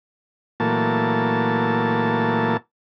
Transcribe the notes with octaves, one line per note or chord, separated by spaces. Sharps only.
A#2 E3 F#3 A3 A#3 A5